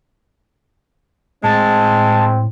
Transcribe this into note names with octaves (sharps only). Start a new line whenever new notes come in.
A2 G#3 C4 A5